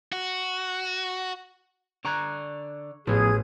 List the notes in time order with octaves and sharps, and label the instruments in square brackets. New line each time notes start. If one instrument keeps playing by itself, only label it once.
[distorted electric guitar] F#4
[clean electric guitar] D3 D5 A#5 [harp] C#6 F#6 G#6
[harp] A1 [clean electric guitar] F3 B3 [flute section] G#4 G#6